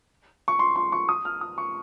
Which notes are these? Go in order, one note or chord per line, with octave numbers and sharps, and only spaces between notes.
C#6
C6
C6
C#6
D#6
F6
D#6
C#6